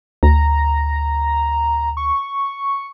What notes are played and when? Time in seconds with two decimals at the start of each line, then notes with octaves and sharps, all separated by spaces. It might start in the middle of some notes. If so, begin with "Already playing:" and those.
0.23 D2 A#5
1.97 C#6